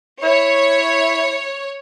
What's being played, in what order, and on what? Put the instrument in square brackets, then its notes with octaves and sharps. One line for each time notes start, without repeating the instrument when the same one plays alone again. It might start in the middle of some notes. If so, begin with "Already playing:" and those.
[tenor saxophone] E4 [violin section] C#5